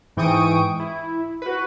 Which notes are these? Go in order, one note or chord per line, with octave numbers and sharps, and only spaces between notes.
G#2 E3 G5 C#6 D#6 D7
E4
F#4 B4